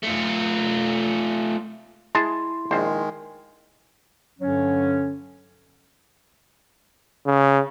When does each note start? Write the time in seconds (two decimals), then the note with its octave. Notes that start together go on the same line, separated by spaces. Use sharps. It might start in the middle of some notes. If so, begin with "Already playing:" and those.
0.04 A3 F4
2.15 G#3 E4 G#4 A5 C6
2.71 A#1 D#3 G#3 C5
4.39 G2 D3 F#3 C#4
7.26 C#3